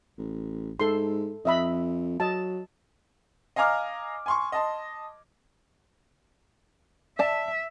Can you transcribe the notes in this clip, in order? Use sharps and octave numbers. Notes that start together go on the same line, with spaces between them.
A1
G#2 A4 C6
F2 D#5 E5 B5
F#3 D#5 A5
D#5 F5 G#5 A#5 D6 F6
G#5 C6 C#6
D#5 A5 C6
D5 E5 A5